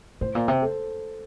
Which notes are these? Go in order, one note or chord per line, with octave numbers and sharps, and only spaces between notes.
A2 C5
A#2
C3 C5
A4